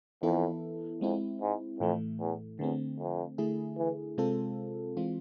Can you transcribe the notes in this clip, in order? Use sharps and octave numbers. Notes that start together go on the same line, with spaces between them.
F2 E3 B3 E4 A4
F2 G#3 C4 E4
G#2
F2 A2 E3 A3
E2
E2 D3 A3 C4
F2
D3 A3 E4 G#4
E3
C3 G#3 C4 F4 A4
E3 G#3 C4 F4